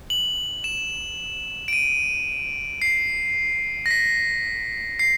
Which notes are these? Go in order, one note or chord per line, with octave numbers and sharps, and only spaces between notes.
F#7
E7
D7
D#7
C7
A#6
B6
C7